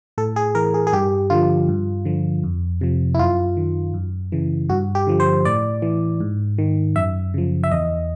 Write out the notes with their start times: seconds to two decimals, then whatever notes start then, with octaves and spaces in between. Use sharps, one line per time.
0.18 A2 A4
0.36 G#4
0.55 E3 A#4
0.74 G#4
0.87 G#4
0.92 G2 G4
1.30 D3 F3 F4
1.68 G2
2.05 D3 F3
2.44 F2
2.81 C3 F3
3.15 E4
3.19 F#2 F4
3.57 D#3
3.94 F#2
4.32 C#3 E3
4.70 G2 F#4
4.95 G4
5.07 D3 F3
5.20 C5
5.45 A2 D5
5.82 E3
6.20 G#2
6.58 D#3
6.96 F#2 E5
7.34 C#3 F3
7.64 E5
7.72 E2 D#5